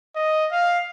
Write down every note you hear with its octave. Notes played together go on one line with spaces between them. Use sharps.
D#5
F5